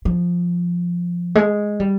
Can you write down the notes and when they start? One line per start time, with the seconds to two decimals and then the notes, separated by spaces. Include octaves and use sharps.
0.05 F3
1.35 G#3
1.80 G3